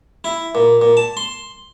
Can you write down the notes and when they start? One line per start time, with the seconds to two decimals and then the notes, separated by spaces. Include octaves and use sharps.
0.24 E4
0.55 A#2
0.82 A#2
0.97 A5
1.17 C6